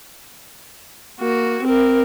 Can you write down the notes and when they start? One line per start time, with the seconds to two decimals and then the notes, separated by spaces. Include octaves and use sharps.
1.20 A#3 F#4
1.63 C4 A#4